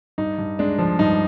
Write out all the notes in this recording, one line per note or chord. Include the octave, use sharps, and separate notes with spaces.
G2 D#4
G2
G#3 D4
F3
G2 D#4